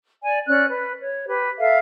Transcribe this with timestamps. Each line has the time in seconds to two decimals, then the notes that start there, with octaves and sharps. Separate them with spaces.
0.24 D5 G#5
0.47 C#4 D5 F#6
0.69 B4
1.01 C#5
1.27 G4 B4
1.59 A4 E5 F5